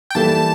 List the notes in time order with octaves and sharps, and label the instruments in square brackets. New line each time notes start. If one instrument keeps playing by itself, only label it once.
[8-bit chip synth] G5
[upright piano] E3 G3 A#3 E4 A4 [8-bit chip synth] A5